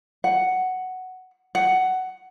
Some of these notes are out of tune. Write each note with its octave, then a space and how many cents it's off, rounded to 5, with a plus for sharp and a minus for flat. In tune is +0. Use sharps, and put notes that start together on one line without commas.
F#5 +5
F#5 +10